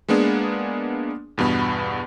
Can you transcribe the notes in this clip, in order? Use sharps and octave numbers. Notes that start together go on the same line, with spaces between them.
G#3 A#3 B3 D4 G#4
E2 G2 B2 B3 B5